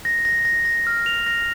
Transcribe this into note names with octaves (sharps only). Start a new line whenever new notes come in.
A#6
A#6
A#6
A#6
F6
F7
A#6